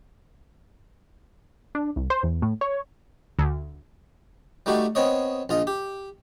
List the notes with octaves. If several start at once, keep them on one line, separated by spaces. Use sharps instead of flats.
D4
C2
C5
E2
A2
C#5
D2
G3 A3 D#4 F#4 G4
B3 C4 C#5 D#5
A#1 F4 D#5
G4